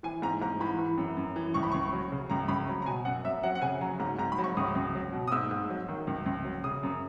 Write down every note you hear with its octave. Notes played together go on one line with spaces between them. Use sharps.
E3 G#5
G#2 A#5
G#2 A#5
E3 B5
E3
F#2
F#2
E3
C#2 C#6
B5
C#2 C#6
F#3
C#3
C#2 A#5
C#2 B5
F#3 A#5
A#5
B2 G#5
F#2 F#5
F#2 E5
F#3 F#5
F#5
C#3 G#5
F#3 A#5
G#2 A#5
G#2 A#5
B5
F#3
C#6
C#2 D#6
C#2
F#3
B2
D#6
G#2 E6
G#2
F#3
D#3
C#2
C#2
F#3
C#3 D#6
F#2